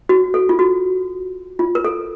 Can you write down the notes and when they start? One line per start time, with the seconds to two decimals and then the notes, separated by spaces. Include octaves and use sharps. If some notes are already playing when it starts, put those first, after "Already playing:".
0.09 F#4
0.34 A4
0.49 F4
0.59 F#4
1.59 F4
1.75 A#4
1.85 A4